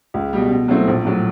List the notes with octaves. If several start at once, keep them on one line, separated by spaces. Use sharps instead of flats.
C#2
B2 G3
B2
F#3 A3 C4 E4
A#1
A2 F#3